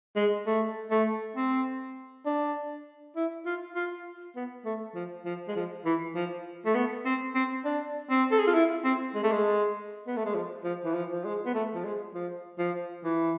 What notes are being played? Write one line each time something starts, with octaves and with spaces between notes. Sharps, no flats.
G#3
A3
A3
C4
D4
E4
F4
F4
B3
A3
F3
F3
G#3
F3
E3
F3
A3
B3
C4
C4
D4
C4
A4
G#4
F4
E4
C4
G#3
A3
G#3
B3
A3
G#3
F3
F3
E3
F3
F3
G#3
B3
A3
F3
G#3
F3
F3
E3